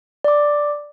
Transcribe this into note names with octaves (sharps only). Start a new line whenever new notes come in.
D5 D6